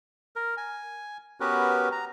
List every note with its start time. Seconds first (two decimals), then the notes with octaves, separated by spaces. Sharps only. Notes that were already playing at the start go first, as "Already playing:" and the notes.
0.36 A#4
0.57 G#5
1.40 B3 C#4 F#4 G4 A#4 B4
1.92 A#5